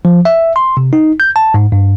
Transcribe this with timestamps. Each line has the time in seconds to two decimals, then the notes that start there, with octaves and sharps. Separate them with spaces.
0.05 F3
0.25 E5
0.56 C6
0.77 C3
0.93 D#4
1.20 G6
1.36 A5
1.54 G#2
1.72 G2